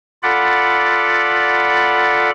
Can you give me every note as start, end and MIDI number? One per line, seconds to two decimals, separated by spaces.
0.23 2.31 65
0.23 2.31 69
0.23 2.31 74
0.23 2.31 78
0.23 2.31 83